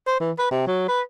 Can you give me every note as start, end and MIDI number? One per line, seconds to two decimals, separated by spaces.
0.07 0.17 72
0.20 0.32 52
0.38 0.50 71
0.51 0.63 48
0.67 0.85 54
0.88 1.01 71